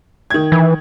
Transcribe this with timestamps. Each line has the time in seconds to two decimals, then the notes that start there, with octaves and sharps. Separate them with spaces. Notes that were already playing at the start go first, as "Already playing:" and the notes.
0.30 D#3 G#6
0.52 E3